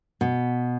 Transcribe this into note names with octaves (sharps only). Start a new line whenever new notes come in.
B2